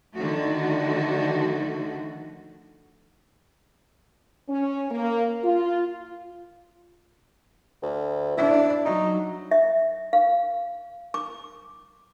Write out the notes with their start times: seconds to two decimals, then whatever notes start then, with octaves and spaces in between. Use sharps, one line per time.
0.15 D3 D#3 F3 A3 F#4
4.49 C#4
4.91 A#3
5.43 F4
7.83 D2
8.37 D4 E4
8.85 F#3 D#4
9.51 E5
10.13 F5
11.14 D6